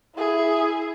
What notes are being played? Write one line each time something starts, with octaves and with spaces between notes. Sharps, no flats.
E4 G#4